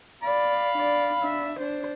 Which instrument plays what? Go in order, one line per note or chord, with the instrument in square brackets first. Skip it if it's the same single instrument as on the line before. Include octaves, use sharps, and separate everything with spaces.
[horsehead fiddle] D5 [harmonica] F5 B5
[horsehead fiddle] D4 D5
D4 E5
D4 C5